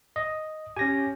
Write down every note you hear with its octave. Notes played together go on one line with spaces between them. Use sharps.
D#5
C#4 G4 G#5 A#6